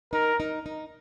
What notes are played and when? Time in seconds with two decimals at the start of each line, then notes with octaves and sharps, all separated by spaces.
0.13 D#4 A#4
0.40 D#4
0.66 D#4